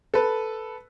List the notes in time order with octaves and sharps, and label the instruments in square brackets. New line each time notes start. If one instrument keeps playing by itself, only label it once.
[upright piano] A4 B4